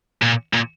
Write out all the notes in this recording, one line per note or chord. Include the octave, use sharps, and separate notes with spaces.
A#2
A#2